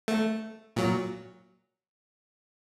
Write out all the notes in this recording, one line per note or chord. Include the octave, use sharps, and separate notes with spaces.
A3
A#2 F#3